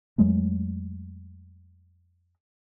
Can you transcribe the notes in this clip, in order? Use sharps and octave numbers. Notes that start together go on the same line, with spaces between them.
F2 F#3 G#3 A3